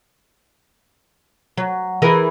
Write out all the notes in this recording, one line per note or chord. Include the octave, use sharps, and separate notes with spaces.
F#3
E3 G#4 A#4